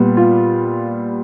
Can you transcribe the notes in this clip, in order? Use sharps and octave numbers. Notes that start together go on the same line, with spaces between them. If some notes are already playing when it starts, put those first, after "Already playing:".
Already playing: A#2 G3 B3
F4